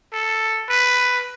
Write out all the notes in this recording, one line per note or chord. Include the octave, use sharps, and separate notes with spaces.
A4
B4